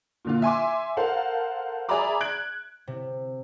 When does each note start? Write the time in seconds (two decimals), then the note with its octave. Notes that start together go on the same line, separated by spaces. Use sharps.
0.25 A#2 D3 F4
0.42 E5 G#5 C6 D6
0.97 A4 A#4 C5 F5 F#5
1.89 G#4 D5 E5 A#5 B5 D6
2.21 F#6 G#6 D7 F#7
2.87 C3